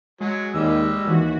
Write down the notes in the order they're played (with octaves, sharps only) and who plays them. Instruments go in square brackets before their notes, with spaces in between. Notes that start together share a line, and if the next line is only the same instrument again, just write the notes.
[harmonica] F#3 [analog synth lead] G#3
[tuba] D#2 [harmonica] G3 E6 [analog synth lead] G#3
[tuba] D#2 [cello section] E3 F#4